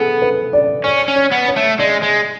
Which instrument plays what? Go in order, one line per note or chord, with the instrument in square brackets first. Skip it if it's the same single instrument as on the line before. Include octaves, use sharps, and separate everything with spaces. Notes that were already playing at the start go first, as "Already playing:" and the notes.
Already playing: [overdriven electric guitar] B3 [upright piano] G#4 A4
[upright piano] B4
D5
[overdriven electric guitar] C#4 [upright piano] D5
[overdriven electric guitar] C#4
[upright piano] C#5
[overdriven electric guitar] B3
[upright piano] C#5
[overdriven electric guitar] A3
[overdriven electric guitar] G#3 [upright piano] D5
[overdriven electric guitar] G#3